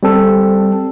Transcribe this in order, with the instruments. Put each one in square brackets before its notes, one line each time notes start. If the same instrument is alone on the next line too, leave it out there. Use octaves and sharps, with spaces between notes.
[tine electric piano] G3 C4 A4